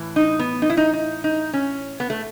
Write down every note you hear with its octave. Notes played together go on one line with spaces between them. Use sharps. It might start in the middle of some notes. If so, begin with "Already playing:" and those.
Already playing: A2 E3
D#4
B3
D#4
E4
D#4
D#4
D#4
C#4
B3
A3